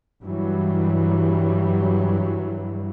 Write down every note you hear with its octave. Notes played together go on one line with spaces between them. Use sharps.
G2 E3 F#3 G3